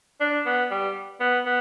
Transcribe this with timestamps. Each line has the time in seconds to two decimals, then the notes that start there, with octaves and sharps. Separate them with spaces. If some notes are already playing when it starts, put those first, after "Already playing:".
0.20 D4
0.46 B3
0.71 G3
1.20 B3
1.46 B3